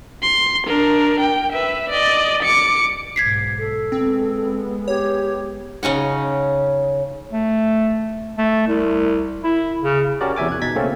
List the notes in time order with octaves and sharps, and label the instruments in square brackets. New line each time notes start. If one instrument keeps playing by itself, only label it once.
[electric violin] C6
D4 A#4
G5
B4 E5
D5 D#5
D6 C#7
[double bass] B1 G#2 [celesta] G#6 B6 C7
[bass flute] A4
[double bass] G#3 B3 [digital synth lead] C4
[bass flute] G4 [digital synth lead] C#5
[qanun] C#3 C#4 D#4 F#5
[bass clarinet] A3
A3
C2
E4
C#3
[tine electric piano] C#4 F#4 G4 A#4 D5
E2 C3 E5 G#5 D6
F#6 G#6
B2 D#4 G#6 A6 B6
C#3 A3 A#3 C4 C#4